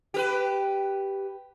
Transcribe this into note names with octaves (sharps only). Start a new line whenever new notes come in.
G4 A#4 B4